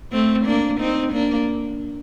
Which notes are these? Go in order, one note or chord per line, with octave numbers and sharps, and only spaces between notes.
A3 C4
A#3 D4
C4 D#4
A#3 D4